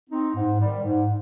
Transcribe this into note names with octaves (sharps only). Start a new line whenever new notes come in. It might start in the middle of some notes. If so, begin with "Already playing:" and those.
C4 D#4
G#2
D#3 G3
G#2